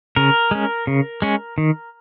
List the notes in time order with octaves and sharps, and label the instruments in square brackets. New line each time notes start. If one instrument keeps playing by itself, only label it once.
[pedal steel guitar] C#3 A#4
G#3 C#4
C#3
G#3 C#4
D#3